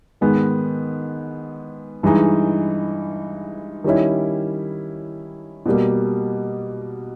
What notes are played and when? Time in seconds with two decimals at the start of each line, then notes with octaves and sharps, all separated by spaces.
0.21 G#2 D#3 G#3 B3
2.03 G2 E3 G#3 D#4
3.84 D#3 G3 C#4 E4
5.66 B2 G3 A#3